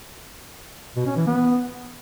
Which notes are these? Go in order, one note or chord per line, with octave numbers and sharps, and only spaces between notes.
B2
C#4
E3
B3